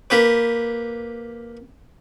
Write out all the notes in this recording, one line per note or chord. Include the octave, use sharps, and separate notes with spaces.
A#3 G4 B4